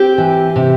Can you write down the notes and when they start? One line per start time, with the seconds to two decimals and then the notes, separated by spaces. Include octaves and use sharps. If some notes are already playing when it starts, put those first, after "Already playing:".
Already playing: C4 G4
0.18 E3
0.56 C3